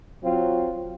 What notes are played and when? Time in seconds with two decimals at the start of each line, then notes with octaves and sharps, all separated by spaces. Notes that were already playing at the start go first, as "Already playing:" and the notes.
0.22 F#3 C4 F4